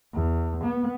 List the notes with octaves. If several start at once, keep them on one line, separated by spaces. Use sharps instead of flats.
E2
B3